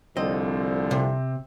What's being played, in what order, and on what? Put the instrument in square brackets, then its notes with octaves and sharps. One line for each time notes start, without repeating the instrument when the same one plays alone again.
[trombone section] C2 D3 F3 [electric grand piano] C4 [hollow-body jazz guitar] D#5
[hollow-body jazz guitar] C3